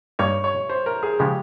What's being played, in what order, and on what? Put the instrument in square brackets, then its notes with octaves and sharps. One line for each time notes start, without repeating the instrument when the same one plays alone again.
[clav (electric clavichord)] G2 G3 A#3 D#4 [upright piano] C#5
[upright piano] C#5
C5
A#4
G#4
[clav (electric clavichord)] C#3 F3 G#3 [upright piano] G4